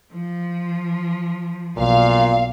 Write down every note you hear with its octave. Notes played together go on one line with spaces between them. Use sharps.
F3
B1 A#2 F5